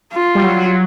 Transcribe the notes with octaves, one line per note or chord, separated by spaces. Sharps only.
F4
G3
F#3
F#3